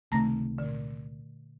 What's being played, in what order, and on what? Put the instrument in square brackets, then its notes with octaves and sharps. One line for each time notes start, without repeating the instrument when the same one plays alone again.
[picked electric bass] C#2 C3 D#3 [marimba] A3 A#5 A#6
[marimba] A#2 D3